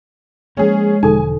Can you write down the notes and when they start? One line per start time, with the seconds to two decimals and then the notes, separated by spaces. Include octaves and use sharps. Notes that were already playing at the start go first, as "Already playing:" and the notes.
0.57 F3 G3 G#3 A#3 C#4 G#4
1.03 E1 D3 F3 D#4 A4 G#5